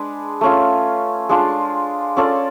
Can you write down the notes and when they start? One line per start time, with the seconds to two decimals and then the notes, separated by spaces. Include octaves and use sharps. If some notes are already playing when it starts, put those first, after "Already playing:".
Already playing: G#3 D4 G#4 B4
0.41 A3 C#4 F4
1.29 G#3 D4 F4
2.17 C#4 F4 A4 D5